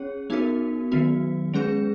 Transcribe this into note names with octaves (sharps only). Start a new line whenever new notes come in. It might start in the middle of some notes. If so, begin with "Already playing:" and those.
Already playing: C#4 G#4 C#5
B3 D#4 F#4 A#4
D#3 F#3 B3 F#4
G#3 C#4 G#4 B4